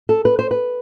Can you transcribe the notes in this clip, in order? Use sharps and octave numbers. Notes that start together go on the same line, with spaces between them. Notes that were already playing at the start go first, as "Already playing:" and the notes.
A4
B4
C5
B4